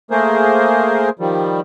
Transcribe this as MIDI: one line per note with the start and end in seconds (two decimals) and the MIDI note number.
0.11 1.10 57
0.11 1.10 58
0.11 1.10 68
0.11 1.10 70
0.11 1.10 72
1.19 1.60 51
1.19 1.60 53
1.19 1.60 55